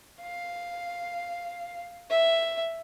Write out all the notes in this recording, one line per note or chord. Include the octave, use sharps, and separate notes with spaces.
F5
E5